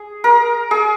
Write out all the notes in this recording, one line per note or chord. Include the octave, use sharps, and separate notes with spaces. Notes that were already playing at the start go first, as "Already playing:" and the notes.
Already playing: G#4
A#4
G#4